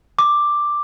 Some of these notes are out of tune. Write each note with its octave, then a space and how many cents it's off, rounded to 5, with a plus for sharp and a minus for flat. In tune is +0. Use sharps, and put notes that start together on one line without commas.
D6 +5